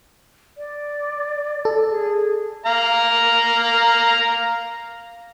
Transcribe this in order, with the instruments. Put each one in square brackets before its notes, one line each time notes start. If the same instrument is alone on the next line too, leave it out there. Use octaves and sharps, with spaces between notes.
[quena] D5
[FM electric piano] A4
[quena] G#4
[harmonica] F5 A#5